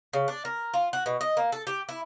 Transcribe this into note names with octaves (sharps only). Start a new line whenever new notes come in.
C#3
D4
A#4
F4
F#4
B2
D#5
A#3
A4
G4
E4